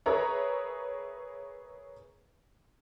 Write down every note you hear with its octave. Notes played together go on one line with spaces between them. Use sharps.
G#4 A#4 B4 C#5 E5 A#5